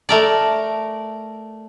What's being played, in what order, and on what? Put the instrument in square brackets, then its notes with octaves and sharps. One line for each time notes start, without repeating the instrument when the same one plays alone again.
[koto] A3 A#4 D5